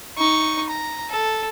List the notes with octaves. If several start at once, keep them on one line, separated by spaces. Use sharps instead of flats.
D#4 C#6
A#5
A4